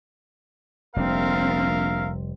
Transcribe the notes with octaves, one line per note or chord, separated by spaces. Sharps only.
F1 A#1 G3 C4 A#4 E5 F5